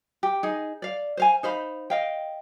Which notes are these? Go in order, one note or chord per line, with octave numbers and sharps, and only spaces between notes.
G4
D#4 G#4
D5 F5
C5 F5 G#5
D#4 C5 F5 B5
D#5 F5 G5